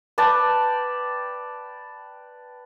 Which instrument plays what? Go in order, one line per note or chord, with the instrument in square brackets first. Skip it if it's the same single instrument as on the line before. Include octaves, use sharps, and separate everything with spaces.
[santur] B4 D5 G5 A5